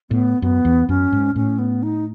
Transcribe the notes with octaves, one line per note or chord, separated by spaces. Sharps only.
A2 B3
F#2 B3
E2
F#2 C#4
G#2
A2 C#4
B3
D#4